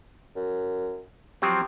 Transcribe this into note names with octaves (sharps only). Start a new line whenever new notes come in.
F#2
F3 F#3 C4 G4